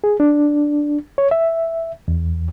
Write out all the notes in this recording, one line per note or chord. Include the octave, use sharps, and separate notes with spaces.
G#4
D4
C#5
E5
E2